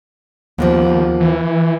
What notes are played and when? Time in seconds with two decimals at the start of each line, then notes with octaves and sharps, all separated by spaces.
0.58 D#2 F3 A#3 B3
1.20 E3